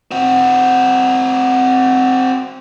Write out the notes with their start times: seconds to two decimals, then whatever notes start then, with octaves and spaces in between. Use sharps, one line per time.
0.11 C4 F#4